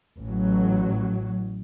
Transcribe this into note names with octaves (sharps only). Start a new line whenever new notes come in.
A1 F#3